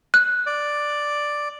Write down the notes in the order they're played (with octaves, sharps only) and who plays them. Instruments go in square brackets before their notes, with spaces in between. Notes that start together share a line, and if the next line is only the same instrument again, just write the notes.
[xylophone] F#6
[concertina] D5